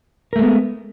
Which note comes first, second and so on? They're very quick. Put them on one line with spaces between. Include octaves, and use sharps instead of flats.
A#4 A3 G#3 B3